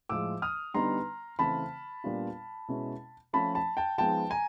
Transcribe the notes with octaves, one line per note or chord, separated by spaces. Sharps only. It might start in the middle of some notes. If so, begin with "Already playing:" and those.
A2 F3 G#3 D6 E6
D#6 F6
D3 G3 B3 D#4 A#5 C6
C#3 E3 A3 C4 A5 B5
A#2 G3 B3 D4 F4
B2 G#3 C#4 E4
F3 A3 C#4 A5 B5
A5 B5
G5 A5
F3 G#3 B3 D#4 G5 A5
G#5 A#5